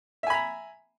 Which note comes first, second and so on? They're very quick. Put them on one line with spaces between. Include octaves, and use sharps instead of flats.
E5 G#5 B5 A#5